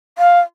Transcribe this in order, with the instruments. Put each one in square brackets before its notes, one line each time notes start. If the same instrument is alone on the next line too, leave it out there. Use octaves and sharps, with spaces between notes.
[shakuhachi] F5